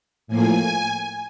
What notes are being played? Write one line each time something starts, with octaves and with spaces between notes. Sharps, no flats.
A2 F3 A#3 G#5